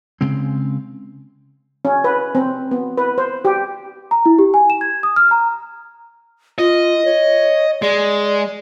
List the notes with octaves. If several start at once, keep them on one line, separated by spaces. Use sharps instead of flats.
C#3 G#3 C4
C#4
B4
C4
B3
B4
C5
G4
A#5
E4
G4
G#5
E7
G#6
D#6
F6
A#5
F4 D#5
C#5
G#3 D5